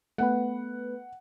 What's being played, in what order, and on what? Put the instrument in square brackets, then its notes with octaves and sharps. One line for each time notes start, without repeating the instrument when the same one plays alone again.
[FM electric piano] A3 B3 B4 [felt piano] F#5